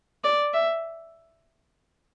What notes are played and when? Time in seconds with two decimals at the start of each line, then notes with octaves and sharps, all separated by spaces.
0.24 D5
0.54 E5